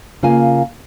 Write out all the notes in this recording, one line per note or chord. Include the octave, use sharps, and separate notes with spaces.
C#3 A#3 F4 F5 G#5